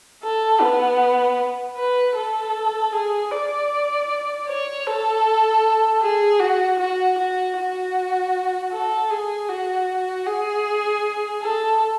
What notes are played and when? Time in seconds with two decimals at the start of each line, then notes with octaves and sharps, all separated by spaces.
0.23 A4
0.61 B3
1.77 B4
2.16 A4
2.93 G#4
3.31 D5
4.48 C#5
4.87 A4
6.02 G#4
6.40 F#4
6.79 F#4
7.18 F#4
7.57 F#4
8.72 A4
9.11 G#4
9.49 F#4
10.27 G#4
11.42 A4